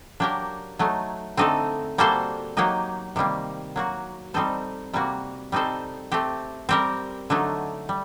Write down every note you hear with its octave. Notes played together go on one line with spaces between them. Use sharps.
F#3 A#3 D4 G4 A#4
F#3 A3 D#4
D3 A3 C4 D#4 A4
G3 A#3 F#4 A4 C5
F#3 A#3 D#4 G4
C3 D#3 G3 A#3
F#3 A#3 F#4
G3 C4 D#4 A4 C5
C3 G3 A#3 F#4
G3 C4 D#4 A4 C5
A3 C4 G4
G3 C4 G4 A#4
D3 F#3 A3 D#4
G3